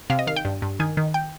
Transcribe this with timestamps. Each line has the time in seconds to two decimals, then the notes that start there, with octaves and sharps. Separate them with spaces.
0.10 C3 F5
0.19 D#5
0.27 D#3 F5
0.36 G5
0.45 G2
0.62 G2
0.80 D#3 G#5
0.97 D#3
1.14 G5